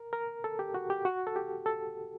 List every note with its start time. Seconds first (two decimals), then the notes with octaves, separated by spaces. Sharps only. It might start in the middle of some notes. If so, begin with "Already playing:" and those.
Already playing: A#4
0.13 A#4
0.44 A4
0.59 G4
0.74 F#4
0.90 G4
1.05 F#4
1.27 A4
1.36 G4
1.66 A4